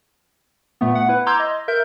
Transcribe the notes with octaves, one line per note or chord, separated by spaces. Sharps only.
A#2 A3 B3
F#5
E4 B4
A#5 C6 D6 E6 G6 G#6
D#5
A#4 E5 G6